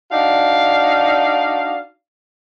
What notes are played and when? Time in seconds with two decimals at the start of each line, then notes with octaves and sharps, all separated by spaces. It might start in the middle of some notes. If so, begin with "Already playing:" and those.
0.11 D4 D#4 F#4 D5 F5